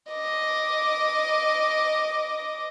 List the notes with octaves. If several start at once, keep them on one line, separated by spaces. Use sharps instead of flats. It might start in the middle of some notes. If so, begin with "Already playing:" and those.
D#5 D6